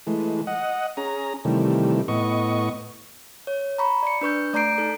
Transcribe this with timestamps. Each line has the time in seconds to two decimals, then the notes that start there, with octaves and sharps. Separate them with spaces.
0.07 E3 G#3 A3
0.47 D#5 F#5
0.97 C#4 G#4 A#5
1.45 C3 D#3 E3 G3 A3
2.08 A2 B3 D#5 C#6
3.47 C#5
3.78 A#5 B5 C#6
4.03 D5 C#7
4.21 D4 B4 C#6 G6
4.53 A3 D5 A#5 G6 C7 D7
4.78 D#4 A4